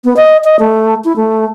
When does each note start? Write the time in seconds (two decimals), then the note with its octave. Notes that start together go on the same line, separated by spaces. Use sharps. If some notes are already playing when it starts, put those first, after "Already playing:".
0.04 B3
0.16 D#5
0.44 D#5
0.59 A3
1.04 E4
1.16 A3